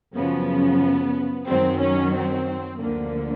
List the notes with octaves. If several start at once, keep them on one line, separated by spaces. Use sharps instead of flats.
F#2 C#3 F3 B3
F#2 D#3 F#3 C4
C#4
C4
D2 D3 F3 A#3